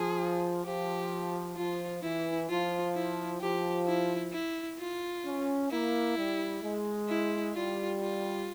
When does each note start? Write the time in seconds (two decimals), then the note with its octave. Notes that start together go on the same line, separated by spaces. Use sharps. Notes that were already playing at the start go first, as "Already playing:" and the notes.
Already playing: F3 G#4
0.64 F3 G4
1.57 F3 F4
2.03 E3 E4
2.49 F3 F4
2.95 E4
3.41 F3 G4
3.86 E4
4.33 E4
4.79 F4
5.25 C#4
5.71 A#3 E4
6.16 G3
6.62 G#3
7.09 E4
7.54 G3 F4
8.00 F4